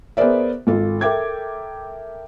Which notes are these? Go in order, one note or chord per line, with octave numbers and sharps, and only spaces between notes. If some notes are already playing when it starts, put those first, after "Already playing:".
B3 G#4 A#4 C5 D5 E5
G#1 F4 A4
A4 A#4 E5 G5 D6 G#6